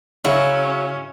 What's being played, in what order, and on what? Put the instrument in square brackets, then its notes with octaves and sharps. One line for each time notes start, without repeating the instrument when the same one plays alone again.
[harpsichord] C#3 [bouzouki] F#3 [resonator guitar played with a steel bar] G#3 E4 [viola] C#4